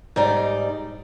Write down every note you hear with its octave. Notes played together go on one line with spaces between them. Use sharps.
G#2 G3 D#4 D5